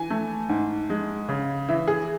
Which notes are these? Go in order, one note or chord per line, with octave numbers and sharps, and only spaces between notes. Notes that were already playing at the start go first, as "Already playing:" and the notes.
Already playing: E3 G#5
A3
G#2
G#3
C#3
E3 E5
G#4